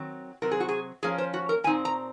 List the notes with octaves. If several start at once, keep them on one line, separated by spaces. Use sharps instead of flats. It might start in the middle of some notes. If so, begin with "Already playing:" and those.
Already playing: D#3 F#3 C4
C3 F#3 C4 A#4
G#4
F#4
G#4
F3 A#3 C#4 G#4
C5
F#4
A#4
A#2 F3 C4 D#4 G#5
A#5